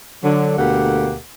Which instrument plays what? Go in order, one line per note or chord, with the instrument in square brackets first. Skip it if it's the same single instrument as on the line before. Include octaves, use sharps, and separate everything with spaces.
[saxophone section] D3 F#3
D2 B2 A#3 G4 A4 F#5